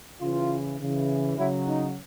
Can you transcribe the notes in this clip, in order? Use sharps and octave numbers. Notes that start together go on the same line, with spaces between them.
C#3 E3 F4
C#3 E3
C#3 F#3 E4
D#4